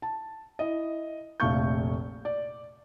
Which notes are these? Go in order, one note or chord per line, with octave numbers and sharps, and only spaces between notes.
A5
E4 D#5
F1 A#1 A3 F5 C#6 G6
D5